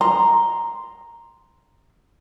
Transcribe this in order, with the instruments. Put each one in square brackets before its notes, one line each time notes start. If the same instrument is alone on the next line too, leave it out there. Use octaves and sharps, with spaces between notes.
[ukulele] A#5 [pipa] C6